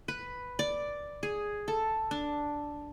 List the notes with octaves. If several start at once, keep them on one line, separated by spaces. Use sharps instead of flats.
B4
D5
G#4
A4
D4